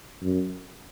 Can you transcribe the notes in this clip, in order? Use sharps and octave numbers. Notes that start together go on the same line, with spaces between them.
F#2